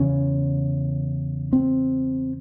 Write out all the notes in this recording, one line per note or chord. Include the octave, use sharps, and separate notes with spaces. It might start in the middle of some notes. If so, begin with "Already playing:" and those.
Already playing: E2 C#3 C#4
C4